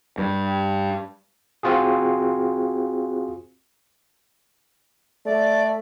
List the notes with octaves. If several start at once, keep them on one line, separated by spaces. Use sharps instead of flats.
G2
C4 F4 F#4 G#4
A3 D5